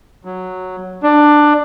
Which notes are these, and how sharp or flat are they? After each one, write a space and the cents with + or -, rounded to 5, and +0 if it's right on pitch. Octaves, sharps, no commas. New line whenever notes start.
F#3 -5
D4 +15